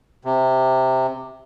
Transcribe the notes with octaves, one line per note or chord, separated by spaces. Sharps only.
C3